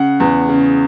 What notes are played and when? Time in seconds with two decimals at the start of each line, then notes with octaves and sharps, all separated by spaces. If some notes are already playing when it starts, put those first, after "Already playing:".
Already playing: C#3 F#5
0.20 E2
0.49 C#3